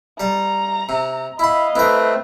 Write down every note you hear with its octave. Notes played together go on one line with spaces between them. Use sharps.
G3 A5 A#5
C3
E4 D#5 F5 B5 C6
A3 C4 E4 A#4 B4